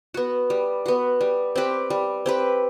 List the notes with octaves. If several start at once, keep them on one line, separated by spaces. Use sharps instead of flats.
B3 F#4
G3
B3 F#4
G3
C4 G4 B4
G3
C4 G4 B4